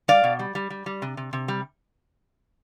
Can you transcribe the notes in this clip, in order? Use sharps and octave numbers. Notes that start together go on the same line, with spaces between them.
G3 D5 F5
B2
G3
G3
G3
G3
C3
C3
C3
G3